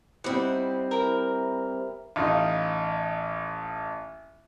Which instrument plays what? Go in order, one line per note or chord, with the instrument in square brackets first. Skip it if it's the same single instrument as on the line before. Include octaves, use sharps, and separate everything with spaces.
[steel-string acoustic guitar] G3 C4 [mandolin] D#4 E4 F#5
[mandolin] E4 A#4
[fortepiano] A1 D#4 F4